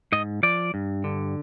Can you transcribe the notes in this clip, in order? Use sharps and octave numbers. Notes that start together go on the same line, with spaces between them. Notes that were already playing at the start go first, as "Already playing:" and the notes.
G#2 D#5
F3 D5
G2
D3